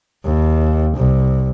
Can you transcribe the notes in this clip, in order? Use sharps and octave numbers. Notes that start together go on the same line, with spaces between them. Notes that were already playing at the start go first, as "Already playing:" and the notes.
D#2
C2